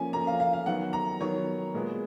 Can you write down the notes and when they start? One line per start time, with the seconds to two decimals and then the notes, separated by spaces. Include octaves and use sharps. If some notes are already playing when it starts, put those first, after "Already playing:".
Already playing: F3 A#3 C#4 G#5
0.13 F3 A#3 C#4 A#5
0.27 F5
0.40 F5
0.53 F5
0.66 D#3 F#3 B3 F#5
0.93 A#5
1.20 D#3 F#3 B3 C#5
1.74 A#2 G#3 B3